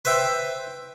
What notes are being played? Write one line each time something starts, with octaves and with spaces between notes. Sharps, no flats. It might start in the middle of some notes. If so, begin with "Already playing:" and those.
B4 C5 E5 G5